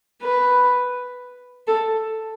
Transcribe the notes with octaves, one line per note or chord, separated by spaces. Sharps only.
B4
A4